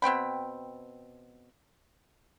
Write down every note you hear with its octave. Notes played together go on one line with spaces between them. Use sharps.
B2 C4 G5 B5